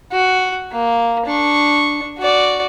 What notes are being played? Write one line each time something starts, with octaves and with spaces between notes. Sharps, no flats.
F#4
A#3
D4 C#6
F#4 D5